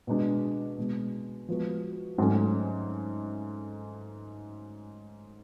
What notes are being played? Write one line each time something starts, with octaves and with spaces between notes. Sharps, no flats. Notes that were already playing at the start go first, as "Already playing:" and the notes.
B2 G#3 D4
B2 G#3 B3
F3 G#3 B3 F#4
G#2 F#3 A3 C#4